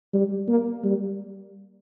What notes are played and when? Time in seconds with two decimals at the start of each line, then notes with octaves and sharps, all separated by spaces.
0.13 G3
0.48 A#3
0.84 G3